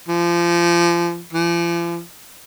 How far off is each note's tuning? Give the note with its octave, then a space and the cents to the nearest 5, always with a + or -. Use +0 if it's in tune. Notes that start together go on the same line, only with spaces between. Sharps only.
F3 -30
F3 -45